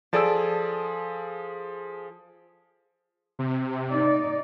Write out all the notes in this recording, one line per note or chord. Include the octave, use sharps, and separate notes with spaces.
F3 G#4 A4 D5 A5 E6
C3
D#4 D5